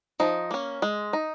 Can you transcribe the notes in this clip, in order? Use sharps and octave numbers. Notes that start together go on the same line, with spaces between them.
F3 D#4
A#3 C#4
G#3
D#4